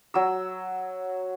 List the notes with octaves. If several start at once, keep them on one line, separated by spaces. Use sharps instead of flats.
F#3 E6